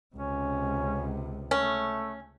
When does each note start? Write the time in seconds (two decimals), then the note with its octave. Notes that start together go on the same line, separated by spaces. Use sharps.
0.15 C#2 C3 C#4
1.51 A3 C#4